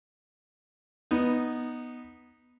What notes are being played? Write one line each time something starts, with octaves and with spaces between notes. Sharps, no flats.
B3 D#4